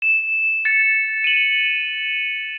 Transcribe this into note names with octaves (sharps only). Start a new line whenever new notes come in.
E7
A6 C#7
D#7 F#7